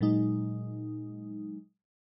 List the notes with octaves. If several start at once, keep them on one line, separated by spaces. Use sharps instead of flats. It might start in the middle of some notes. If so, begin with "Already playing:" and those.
A#2 F#3 G#3 D#4